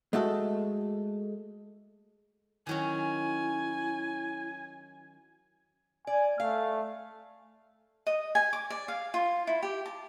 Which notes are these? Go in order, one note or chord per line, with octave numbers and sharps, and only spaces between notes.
G#3 A3 F#4 A4
D#3 F#3 C#4 E4 G#5
D5 G#5
A3 F5
D#5
G#5
D6
D5
F5
F4
E4
G4
A5